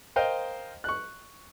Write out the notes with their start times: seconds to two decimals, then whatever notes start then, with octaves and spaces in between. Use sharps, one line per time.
0.16 A#4 C5 D#5 F5 G5
0.84 C#6 F#6